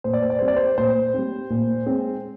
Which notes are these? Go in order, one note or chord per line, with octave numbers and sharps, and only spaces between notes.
A#2 C5
D5
C5
D5
G3 C4 C5
D5
C5
A#2 C5
G3 C4
A#2
G#3 C4